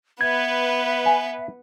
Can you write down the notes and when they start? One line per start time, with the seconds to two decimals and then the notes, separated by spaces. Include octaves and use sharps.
0.21 B3 B4 E5 G#6
1.06 G#5